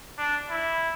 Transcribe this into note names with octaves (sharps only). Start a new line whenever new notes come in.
D4
E4